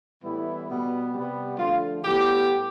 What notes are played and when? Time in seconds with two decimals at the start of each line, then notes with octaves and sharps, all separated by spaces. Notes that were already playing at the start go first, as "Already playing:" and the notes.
0.23 A2 E3 G3 B3 E4
0.68 B2 G3 B3
1.14 C3 G3 B3
1.58 D3 F3 A3 F4
2.03 A2 G3 B3 G4